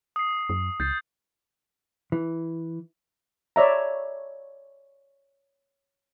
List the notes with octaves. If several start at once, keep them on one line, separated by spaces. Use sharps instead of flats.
D#6 C7
F#2 D#6
C#2 G6 A6 C7
E3
C#5 D5 E5 A#5